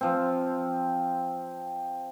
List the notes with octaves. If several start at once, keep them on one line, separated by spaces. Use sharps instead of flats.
F3 C4